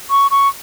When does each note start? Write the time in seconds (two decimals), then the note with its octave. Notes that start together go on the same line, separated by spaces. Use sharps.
0.10 C#6
0.31 C#6